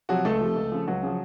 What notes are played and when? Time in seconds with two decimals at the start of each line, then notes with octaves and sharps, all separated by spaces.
0.09 C3 F3 F#3 F#4
0.25 C#2 A3 A4
0.41 C3 F3
0.56 C#2
0.72 C#3 F3
0.87 C#2 F#3 F#4
1.03 C#3 F3